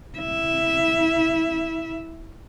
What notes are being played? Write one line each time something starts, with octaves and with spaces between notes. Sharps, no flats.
E4 E5